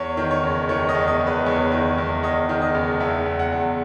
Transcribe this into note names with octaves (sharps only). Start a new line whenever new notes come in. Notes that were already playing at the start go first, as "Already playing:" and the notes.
Already playing: E2 C#5
D#3
C#5
F#1
D#3 C#5
D#5
E2
D#5
E2
B4
E2 C#5
D#3
E2
E2 D#5
D#3
D#5
F#1
E2 E5
E2
F#5
E2